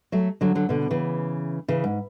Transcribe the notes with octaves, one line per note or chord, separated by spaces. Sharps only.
F#3 A3
D3 F#3
D3 F#3
B2 D3
C#3 E3
C#3 E3
G#2